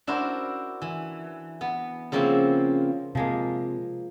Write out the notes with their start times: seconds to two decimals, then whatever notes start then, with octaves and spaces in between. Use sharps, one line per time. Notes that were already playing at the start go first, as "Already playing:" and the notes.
0.07 D4 E4 F#4 A#4 C5
0.82 E3
1.61 B3
2.12 C#3 F3 A#3 C4 E4 F5
3.15 C3 F3 G#3 A#3